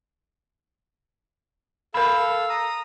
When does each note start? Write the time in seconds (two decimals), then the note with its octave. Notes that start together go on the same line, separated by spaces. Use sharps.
1.94 A4 A#4 F5 B5 E6
2.49 A#5 D#6